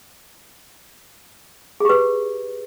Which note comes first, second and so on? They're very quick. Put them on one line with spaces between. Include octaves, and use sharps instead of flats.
G#4 G4 B4